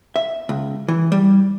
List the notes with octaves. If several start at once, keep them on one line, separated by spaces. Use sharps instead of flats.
E5
C#2
E3
G3